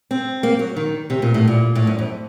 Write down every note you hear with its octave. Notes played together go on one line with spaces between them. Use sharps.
C4
A#3
F#3
D#3
C3
A#2
A2
A#2
A2
F#2
F2